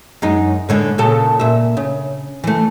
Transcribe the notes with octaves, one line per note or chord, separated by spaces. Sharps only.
F#2 G#3 D#4
A2 D3 G#3
A#2 C#3 A4
A#2 E5
C#3
E3 A3